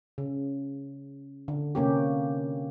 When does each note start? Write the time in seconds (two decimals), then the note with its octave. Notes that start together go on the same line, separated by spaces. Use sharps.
0.18 C#3
1.48 D3
1.75 C3 A#3 C#4 G4